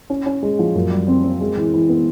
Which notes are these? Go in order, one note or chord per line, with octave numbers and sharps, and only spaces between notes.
C#4
C#4
G#3
F3
F#2
G3
C4
C4
G#3
E3
E3
B3